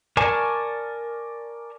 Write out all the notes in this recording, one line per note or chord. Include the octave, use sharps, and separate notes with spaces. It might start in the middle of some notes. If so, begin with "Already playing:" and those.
A#4 D5 G#5 A5 C#6